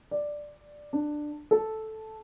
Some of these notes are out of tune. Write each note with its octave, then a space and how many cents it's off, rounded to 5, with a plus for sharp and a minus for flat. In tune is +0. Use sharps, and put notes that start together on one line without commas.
D5 +5
D4 +15
A4 -5